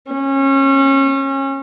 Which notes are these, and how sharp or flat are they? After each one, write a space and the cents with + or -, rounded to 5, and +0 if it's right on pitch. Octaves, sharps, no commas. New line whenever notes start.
C#4 -30